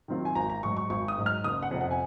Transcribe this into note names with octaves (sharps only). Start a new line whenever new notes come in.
D#3 F#3 C4 F4
G#5
G#1 A#5
A#5
G#2 F#3 C#6
C#6
G#1 C#6
D#6
G#2 F#3
F6
F#1 D#6
F#5
F2 C3
F#5
G#5